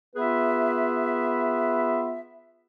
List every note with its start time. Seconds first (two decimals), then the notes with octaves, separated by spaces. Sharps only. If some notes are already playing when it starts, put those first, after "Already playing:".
0.16 B3 F4 G#4 B4 E5